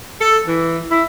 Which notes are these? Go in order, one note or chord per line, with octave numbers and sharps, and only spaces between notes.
A4
E3
E4